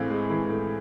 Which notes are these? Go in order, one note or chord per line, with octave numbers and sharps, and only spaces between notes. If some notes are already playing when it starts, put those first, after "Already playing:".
Already playing: A2 E3 G#3 C4 F5
G#3
E3
A2